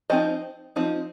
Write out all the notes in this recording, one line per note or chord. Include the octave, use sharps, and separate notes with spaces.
F3 C4 D#4 C5 D#5
F3 C4 D#4